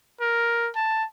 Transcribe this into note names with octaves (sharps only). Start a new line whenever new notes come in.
A#4
A5